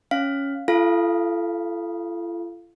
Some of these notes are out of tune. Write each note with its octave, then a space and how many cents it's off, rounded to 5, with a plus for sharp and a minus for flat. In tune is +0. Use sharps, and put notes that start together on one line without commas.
C#4 +0 F5 +5
F4 -45 A4 -15 F5 +0